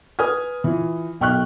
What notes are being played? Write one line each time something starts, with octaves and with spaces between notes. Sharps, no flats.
B4 G#5 D#6 F6 G#6
E3 F4
B1 G5 C#6 F6 F#6